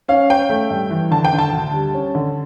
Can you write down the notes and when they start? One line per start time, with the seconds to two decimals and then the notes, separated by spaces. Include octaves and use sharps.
0.08 C#4 F5
0.30 C#4 G5
0.50 A3
0.70 G2
0.91 E3
1.11 D3 A5
1.25 G5
1.33 D3
1.39 A5
1.53 D2
1.74 G3
1.94 C#4
2.15 D3